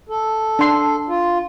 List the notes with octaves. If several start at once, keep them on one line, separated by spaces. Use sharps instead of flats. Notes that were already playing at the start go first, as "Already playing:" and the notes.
A4
D4 C6
F4